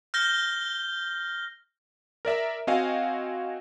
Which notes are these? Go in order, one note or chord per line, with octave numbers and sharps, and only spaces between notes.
F6 G6 A#6 G7
A#4 D5 E5 A#5
C4 F#4 D#5 F5 G5 G#5